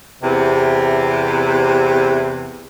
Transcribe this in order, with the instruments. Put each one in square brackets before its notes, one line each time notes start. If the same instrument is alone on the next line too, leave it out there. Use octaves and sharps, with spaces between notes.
[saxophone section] E2 C3